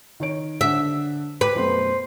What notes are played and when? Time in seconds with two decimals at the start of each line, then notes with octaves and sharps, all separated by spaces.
0.20 D#3 C#5 D7
0.61 D3 E5
1.41 B4 G5 D6
1.55 F#2 B2 A3 C5